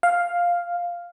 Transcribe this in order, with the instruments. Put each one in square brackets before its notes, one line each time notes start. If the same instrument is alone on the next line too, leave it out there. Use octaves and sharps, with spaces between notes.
[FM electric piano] F5